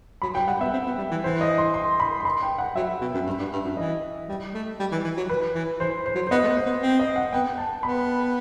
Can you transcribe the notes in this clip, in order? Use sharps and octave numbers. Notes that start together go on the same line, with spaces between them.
F#3 B5
F#3 G5
G3 F#5
B3 E5
C4
B3
G3
E3
E3 C5
D#5
C6
C6
B5
C6
B5
G5
F#5
F#3 E5
B2
F#2
G2
G2
G2
F#2
E3 D#5
G3
A3
G3
E3
E3
F#3
B4
E3
E3 C5
C5
F#3
C5
B3 D#5
A3
B3
C5
B3
C4
D#5
F#5
B3 G5
A5
B3 B5